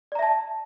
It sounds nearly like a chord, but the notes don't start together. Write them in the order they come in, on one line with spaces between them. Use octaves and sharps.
D5 A#5 E5 A5